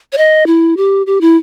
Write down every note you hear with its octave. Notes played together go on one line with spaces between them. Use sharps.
C#5
D#5
E4
G4
G4
E4